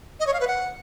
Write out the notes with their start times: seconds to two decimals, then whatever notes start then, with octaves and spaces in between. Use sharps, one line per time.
0.20 D#5
0.27 C#5
0.34 F5
0.40 B4
0.47 F#5